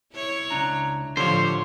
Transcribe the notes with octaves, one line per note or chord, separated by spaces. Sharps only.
E4 C#5
C#2 D4 A#5
A2 D3 F3 G4 C5 C#5 F5